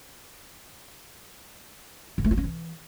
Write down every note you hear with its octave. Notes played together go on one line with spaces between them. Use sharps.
D3
A3
F4
C#4
E3